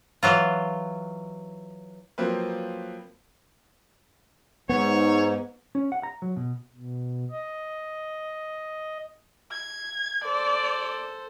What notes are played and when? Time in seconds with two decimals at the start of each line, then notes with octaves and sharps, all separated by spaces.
0.23 E3 F#3 F4
2.18 F3 F#3 A#3 C4 B4
4.69 G#2 B3 C#5
5.75 C#4
5.92 F#5
6.03 A#5
6.22 F#3
6.37 B2
6.75 B2
7.31 D#5
9.51 G#6
10.24 A4 C5 D5